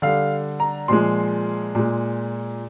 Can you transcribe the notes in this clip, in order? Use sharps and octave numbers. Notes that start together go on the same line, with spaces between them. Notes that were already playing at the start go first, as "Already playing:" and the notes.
D3 G3 F5
A#5
A#2 F3 G#3 C6
A#2 G#3